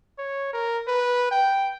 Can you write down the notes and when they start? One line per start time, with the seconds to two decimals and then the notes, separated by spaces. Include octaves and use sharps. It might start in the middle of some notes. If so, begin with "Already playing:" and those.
0.18 C#5
0.53 A#4
0.88 B4
1.31 G5